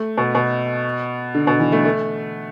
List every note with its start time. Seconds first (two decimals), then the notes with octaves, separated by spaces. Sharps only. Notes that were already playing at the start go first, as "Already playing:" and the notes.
Already playing: A3
0.18 B2
0.35 B2
1.35 D3
1.47 B2
1.60 E3
1.72 A3
1.85 A3